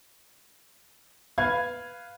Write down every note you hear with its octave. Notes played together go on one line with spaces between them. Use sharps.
B4 F5 G#6